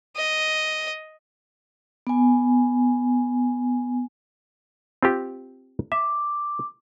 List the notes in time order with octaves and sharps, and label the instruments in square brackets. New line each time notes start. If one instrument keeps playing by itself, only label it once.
[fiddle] D#5
[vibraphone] B3 G#5
[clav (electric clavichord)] C4 F4 G4
[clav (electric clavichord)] E5 [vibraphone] D6